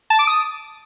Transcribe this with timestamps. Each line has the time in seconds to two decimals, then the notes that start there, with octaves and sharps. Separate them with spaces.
0.10 A5
0.19 D6
0.27 D#6